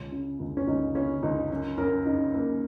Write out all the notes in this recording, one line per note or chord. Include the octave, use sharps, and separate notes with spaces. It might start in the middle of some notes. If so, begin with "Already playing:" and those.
Already playing: C#2 C#4
C#3
C#2
C#4
C#2 D#4
C#3 C#4
C#2 D#4
F#2
F#2 A#4
C#3 D#4
F#2 A#3